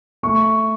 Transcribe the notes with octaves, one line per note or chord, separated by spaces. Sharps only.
A3 C#6